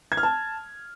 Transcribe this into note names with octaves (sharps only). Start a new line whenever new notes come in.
G#6
F6
A5